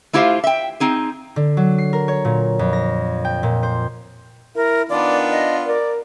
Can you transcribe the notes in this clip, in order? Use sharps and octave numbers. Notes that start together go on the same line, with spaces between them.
A3 E4 F4 G4 C5 F5
E5 G5
C4 D#4 G#4
D3
F#3
C7
A#4
C#5
A#2
F2
A#6
G5
A#2
C5
E4 A#4
D#3 B3 D4 F4 D5
D#5
A#4 D5